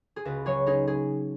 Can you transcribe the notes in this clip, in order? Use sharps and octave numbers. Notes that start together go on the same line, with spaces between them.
G#4
C#2 F#4 B4
F#3 G#4 C#5
C#4 D#4 G#4
G#4